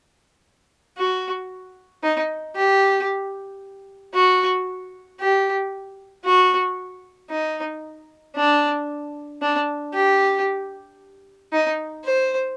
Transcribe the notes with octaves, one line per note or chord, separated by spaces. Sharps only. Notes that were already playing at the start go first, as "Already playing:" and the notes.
F#4
D#4
G4
F#4
G4
F#4
D#4
D4
D4
G4
D#4
C5